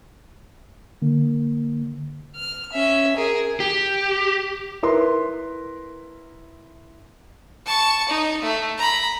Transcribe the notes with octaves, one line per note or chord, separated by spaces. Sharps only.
D3 A#3
F6
C#4 E5
G#4 A#4
G4
E4 A#4 B4 C6
A5 C#6
D#4
A3
A#5 B5